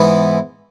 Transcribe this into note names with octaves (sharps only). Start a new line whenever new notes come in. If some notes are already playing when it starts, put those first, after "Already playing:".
Already playing: G#2 E3 B3 E4